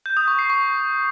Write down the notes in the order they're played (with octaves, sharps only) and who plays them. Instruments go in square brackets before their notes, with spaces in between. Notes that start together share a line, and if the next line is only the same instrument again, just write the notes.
[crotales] G6
D#6
C#6
C7
C#6